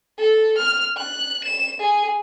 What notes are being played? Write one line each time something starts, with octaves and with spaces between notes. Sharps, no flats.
A4
F6
F#6
E7
G#4